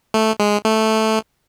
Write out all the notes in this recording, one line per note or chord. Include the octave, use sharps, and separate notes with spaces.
A3
G#3
A3